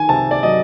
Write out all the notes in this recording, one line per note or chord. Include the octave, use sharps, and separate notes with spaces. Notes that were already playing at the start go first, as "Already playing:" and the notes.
Already playing: D#3 G#5
C3 A5
D5
F#3 D#5